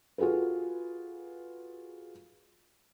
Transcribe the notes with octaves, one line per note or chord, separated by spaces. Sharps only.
F4 F#4 G#4 A4 B4